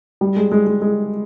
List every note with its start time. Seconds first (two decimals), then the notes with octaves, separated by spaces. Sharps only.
0.21 G3
0.36 G#3
0.52 G#3
0.67 G#3
0.82 G#3